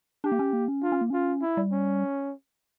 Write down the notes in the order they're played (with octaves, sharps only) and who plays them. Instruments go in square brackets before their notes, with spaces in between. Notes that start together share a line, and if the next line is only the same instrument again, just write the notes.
[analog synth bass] D4 [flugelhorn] G4
[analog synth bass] A#3
C#4
A#3
C#4
[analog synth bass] D4 [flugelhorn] F4
[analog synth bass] C#4
A#3
[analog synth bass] C#4 [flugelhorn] F4
[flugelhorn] E4
[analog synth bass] G3
[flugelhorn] C#4